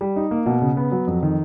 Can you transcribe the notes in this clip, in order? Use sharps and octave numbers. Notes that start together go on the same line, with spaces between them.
G3
D#4
A#3
B2
C#3
B3
F#3
F2
D#3